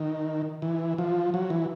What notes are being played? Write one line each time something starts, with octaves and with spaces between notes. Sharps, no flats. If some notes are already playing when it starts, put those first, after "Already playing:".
Already playing: D#3
E3
F3
F#3
E3